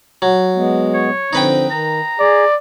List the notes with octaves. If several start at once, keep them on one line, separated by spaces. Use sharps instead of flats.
F#3
G#3 B3
C#5
D3 F3 C4 D#4 B4 G5
D#3 A#5
G#4 D5